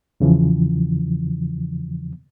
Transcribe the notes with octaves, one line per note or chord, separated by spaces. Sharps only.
E2 C#3 E3 F3